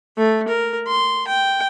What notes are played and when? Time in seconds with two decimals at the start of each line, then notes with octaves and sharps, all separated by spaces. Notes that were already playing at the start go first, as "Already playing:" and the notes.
0.17 A3
0.48 A#4
0.87 C6
1.27 G5